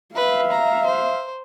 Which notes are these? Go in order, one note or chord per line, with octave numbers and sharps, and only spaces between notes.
B4 E5 F5
A#5
C5